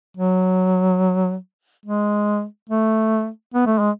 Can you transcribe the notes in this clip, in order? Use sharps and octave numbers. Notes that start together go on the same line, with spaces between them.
F#3
G#3
A3
B3
A3
G#3